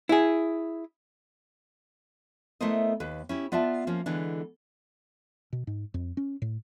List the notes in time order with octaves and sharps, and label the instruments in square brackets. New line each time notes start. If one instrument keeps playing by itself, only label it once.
[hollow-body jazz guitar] E4 G#4
[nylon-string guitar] A3 B3 E4 A#4 C5 D#5
D#2 B4
C#4 E4 G4
B3 F4 D5 E5 A5
F3 A#3 C#4
D3 E3 G#3 B3 D4
[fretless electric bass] B2
G#2
F2
C#4
A2